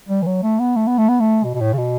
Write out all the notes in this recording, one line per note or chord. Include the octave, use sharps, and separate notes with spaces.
G3
E3
F#3
A3
B3
A3
B3
A3
B3
A3
B2
B2
A2
C#3
B2